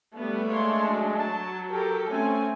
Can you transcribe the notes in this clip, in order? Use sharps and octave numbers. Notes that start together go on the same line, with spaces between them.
G3 A3 B3 D4
G#3 A#3 C#5 C6
F#3
A5
G4 A4 A#4
A3 C4 C#4 G#5